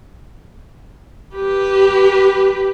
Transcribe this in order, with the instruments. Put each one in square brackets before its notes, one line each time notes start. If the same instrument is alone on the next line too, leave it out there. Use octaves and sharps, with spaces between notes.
[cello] G4 B4